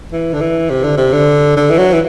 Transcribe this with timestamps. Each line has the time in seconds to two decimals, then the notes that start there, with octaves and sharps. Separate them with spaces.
0.12 E3
0.33 D3
0.41 E3
0.70 C3
0.84 D3
0.97 C3
1.13 D3
1.56 D3
1.70 E3
1.78 F#3
1.93 E3